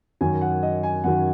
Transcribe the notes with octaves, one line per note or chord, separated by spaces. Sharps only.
F#2 D#3 F#3 G#5
F#5
D#5
G#5
F#2 D#3 F#3 F#5